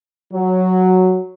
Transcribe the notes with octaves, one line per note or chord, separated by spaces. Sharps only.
F#3